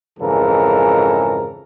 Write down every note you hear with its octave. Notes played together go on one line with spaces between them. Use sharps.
F2 G#2 C#3 E3 A4 A#4